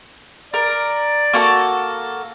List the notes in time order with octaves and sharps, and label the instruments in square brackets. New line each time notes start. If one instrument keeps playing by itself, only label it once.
[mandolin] A#4 [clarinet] D5
[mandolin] A#3 F#4 A4